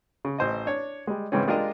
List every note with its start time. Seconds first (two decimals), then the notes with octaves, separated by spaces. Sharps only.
0.25 C#3
0.39 A1 C5 D#5
0.66 D4 C#5
1.07 G3 G#3
1.32 G#2 C#3 E3 C4 C#4
1.48 G#3 D4 F4 G4 A#4 D#5